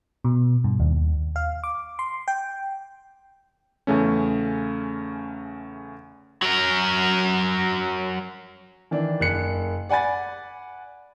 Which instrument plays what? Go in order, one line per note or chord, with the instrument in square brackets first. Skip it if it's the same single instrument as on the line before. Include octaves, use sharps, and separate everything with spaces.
[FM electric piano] B2
G2
D#2
F5
D6
C6
G5
[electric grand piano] E2 C#3 A3 C#4
[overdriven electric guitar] F#3 A#4
[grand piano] D#3 E3 D4
F#1 F#6 C#7
D5 F#5 G#5 B5 A6